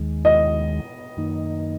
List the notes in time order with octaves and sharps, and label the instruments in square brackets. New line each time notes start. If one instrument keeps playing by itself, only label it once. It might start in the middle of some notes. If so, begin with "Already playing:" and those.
Already playing: [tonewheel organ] D#2 D#3 G#3
[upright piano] D#5
[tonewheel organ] F#2 D#3 A#3 D#4